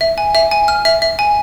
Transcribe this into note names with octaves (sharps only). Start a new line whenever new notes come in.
E5
G#5
E5
G#5
F6
E5
E5
G#5